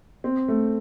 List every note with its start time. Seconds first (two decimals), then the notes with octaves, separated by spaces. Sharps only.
0.24 C4
0.48 A3